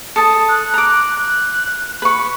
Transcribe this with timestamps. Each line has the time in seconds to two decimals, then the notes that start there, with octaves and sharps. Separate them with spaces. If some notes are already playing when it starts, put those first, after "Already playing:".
0.16 A4 A5 D#6
0.48 F#6
0.74 A#5 D6
1.18 F#6
2.02 B4 C#6